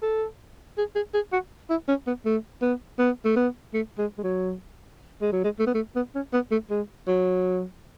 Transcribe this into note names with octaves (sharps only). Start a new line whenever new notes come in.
A4
G#4
G#4
G#4
F#4
E4
C#4
B3
A3
B3
B3
A3
B3
A3
G#3
G#3
F#3
G#3
F#3
G#3
A3
B3
A3
B3
C#4
B3
A3
G#3
F#3